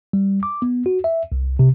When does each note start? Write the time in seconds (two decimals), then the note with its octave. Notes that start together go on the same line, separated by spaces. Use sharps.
0.13 G3
0.43 D6
0.62 B3
0.86 F#4
1.04 E5
1.32 C2
1.59 C3